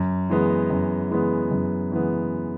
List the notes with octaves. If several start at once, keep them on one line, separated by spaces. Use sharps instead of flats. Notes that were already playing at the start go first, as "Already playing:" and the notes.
Already playing: F#2
E3 G#3 B3
F#2
E3 G#3 B3
F#2
E3 G#3 B3